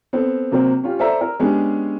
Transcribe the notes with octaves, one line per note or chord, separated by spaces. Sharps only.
B3 C4 A4
C3 F#3 A#3 C4
C#4 F4 G4
A4 C5 D5 E5 A#5 E6
A#4
G#3 B3 C#4 D4 G4 G#4